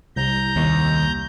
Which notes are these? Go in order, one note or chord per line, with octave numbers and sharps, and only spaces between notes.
C2 A#5 G6
D#2